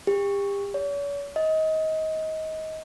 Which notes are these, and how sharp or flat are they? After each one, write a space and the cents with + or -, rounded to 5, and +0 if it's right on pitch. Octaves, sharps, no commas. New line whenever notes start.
G4 +35
C#5 +45
D#5 +25